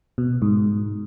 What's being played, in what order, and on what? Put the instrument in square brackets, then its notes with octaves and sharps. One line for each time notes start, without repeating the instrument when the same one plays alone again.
[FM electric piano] B2
G#2